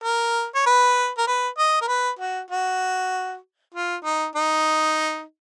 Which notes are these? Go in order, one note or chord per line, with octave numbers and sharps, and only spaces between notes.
A#4
C#5
B4
A#4
B4
D#5
A#4
B4
F#4
F#4
F4
D#4
D#4